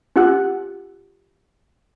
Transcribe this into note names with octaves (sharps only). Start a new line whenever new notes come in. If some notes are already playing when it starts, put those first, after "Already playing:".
C#4 F4 G4 F#5 E6 F#6